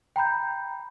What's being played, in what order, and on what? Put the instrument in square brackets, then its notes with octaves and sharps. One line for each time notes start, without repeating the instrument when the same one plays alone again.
[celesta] G5 A#5 B5 G6